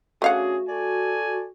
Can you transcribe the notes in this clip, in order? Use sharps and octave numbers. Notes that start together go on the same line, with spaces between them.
A3 C#4 D4 F#4 G#4 F5 F#5
A4 D5 G#5